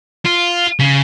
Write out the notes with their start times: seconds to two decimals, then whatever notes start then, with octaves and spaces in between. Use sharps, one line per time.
0.25 F4
0.79 C#3